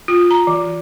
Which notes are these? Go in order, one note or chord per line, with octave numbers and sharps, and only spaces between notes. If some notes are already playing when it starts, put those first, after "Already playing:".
F4
A#5
E3